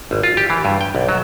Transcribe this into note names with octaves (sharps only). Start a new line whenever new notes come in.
G#1
F4
G4
E3
G2
G5
B1
F#3